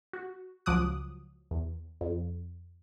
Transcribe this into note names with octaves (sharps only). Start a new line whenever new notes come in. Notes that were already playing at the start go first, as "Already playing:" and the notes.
F#4
C#2 F3 F#3 D6 D#6 F#6
E2
F2